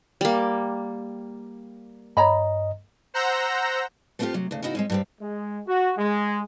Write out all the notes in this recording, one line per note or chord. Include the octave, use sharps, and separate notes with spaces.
G3 A#3
G2 C#5 D#5 A#5 B5
C5 F#5 A#5 E6 G6 A#6
A3 B3 C4 E4 F4 G4
C3 F#3
D2 C#3
C#3 B3 D#4 E4 F#4
G#3 C4 C#4
G2 G3 C4
G#3
F#4
G#3